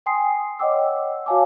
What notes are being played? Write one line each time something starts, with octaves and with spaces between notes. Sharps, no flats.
G5 G#5 C6 D#6 C7
C#5 D#5 F#5 G5 D6 E6
F#4 C#5 F5 G#5 A5 D6